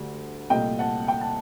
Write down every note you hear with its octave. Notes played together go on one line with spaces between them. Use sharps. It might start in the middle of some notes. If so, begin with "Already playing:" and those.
Already playing: D2 D3 G3
C2 A#2 A3 D#5 G5
F#5 A5
G5
A5